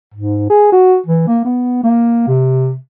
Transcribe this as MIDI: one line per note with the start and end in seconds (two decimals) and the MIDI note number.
0.14 0.49 44
0.50 0.72 68
0.72 0.97 66
1.06 1.23 52
1.27 1.40 58
1.45 1.81 59
1.83 2.24 58
2.27 2.76 48